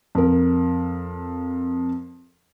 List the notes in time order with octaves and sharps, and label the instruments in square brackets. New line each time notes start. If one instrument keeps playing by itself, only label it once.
[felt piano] F2 A#4